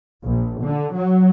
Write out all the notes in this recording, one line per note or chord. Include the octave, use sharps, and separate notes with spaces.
A#1
D3
F#3